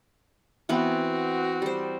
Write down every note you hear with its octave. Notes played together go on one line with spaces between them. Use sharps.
E3 B3 C4 F#4 B4
G3 C5